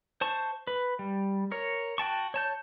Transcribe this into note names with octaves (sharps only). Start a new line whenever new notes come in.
C5 A5 C#6
B4
G3
A#4 C#5
F#4 G5 A5 C#6
C#5 A5 G6